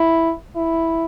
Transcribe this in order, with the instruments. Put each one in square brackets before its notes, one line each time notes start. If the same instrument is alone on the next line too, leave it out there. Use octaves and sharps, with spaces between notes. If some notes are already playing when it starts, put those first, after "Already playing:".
Already playing: [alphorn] E4
E4